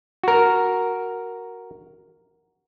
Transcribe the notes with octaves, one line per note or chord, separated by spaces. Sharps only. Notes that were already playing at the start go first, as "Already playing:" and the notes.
F#4 A#4